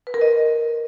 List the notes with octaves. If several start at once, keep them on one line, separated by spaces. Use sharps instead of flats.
B4
A#4
D#5